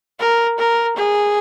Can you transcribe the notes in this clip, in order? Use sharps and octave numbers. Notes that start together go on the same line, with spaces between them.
A#4
A#4
G#4